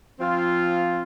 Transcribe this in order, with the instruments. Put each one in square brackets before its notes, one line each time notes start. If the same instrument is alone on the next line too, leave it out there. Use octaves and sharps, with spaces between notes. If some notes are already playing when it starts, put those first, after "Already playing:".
[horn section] F3 C4 F4